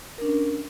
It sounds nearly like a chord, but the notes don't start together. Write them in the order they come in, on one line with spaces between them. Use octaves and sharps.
A#4 D4 C#4